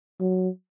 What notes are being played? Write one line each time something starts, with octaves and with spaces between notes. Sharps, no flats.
F#3